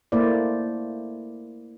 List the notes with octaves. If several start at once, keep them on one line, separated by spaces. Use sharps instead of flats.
A3 A#3 E4 C5 D5